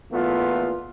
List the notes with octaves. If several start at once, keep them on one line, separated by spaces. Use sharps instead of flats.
E2 A#2 A3 B3 F4